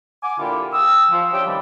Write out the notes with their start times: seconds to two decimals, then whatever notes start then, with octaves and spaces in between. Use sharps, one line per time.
0.23 F#5 G#5 D6
0.39 A#2 D3 E4 F4 G4
0.73 G5 D#6 E6
1.11 F3
1.32 C#4 D4 G4 E5 G5
1.46 C3 D#3 E3 G3